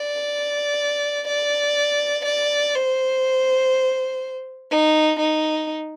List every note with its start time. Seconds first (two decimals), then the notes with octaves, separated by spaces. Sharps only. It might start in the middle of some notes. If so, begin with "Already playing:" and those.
Already playing: D5
1.28 D5
2.25 D5
2.75 C5
4.71 D#4
5.20 D#4